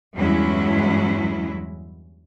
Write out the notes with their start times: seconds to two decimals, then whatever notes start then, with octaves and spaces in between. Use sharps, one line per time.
0.15 E2 G2 F#3 G#3 C#4 E4